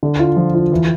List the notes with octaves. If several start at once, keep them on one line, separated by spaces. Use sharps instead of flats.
D3
F4
F3
F4
E3